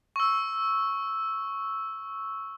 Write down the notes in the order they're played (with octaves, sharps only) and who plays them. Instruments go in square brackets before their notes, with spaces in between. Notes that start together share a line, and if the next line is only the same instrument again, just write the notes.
[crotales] C#6 E6